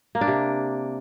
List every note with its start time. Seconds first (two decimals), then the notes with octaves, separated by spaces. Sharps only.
0.15 A#3
0.21 D4
0.28 C3